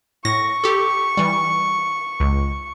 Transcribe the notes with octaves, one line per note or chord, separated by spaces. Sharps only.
A2 C#6 A#6
G4 A4
E3 G3
C#2